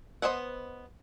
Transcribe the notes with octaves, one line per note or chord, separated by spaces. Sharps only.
B3 C5 D#5 E5 F#5